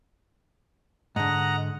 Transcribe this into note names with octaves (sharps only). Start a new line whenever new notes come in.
G#2 D3 D#5 F#5 A#5